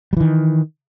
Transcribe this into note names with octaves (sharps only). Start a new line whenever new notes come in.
D#3 E3 G3